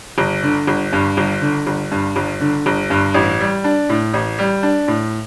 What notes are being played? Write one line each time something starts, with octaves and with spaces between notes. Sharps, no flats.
G1
D3
G1
G2
G1
D3
G1
G2
G1
D3
G1
G2
A1
G3
D4
A2
A1
G3
D4
A2